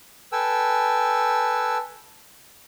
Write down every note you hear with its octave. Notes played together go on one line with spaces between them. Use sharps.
A4 B4 G5 G#5 E6